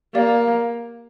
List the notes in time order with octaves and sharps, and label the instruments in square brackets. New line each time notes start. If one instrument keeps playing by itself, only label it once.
[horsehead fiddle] A#3 [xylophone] G4 D5 F5